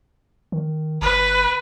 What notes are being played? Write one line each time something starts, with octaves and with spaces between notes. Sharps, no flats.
D#3
G1 B4